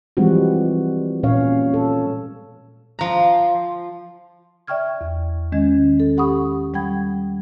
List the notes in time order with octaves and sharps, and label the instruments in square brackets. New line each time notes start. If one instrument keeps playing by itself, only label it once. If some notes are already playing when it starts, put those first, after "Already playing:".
[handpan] E3 F3 G3 G#3 C4 F#4
A#2 C#4 C#5 F5
A4
[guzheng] F3 A#5
[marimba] D5 E5 G5 C#6 F6 G#6
E2
D#3 G#3 C#4 D#5 G#6
A4
G4 F#5 B5 C#6 D#6
G3 F#5 G5 B5 G#6